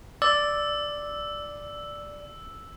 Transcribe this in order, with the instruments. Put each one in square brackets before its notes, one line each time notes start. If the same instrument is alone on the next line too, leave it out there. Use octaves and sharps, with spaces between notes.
[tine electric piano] D5 [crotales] E6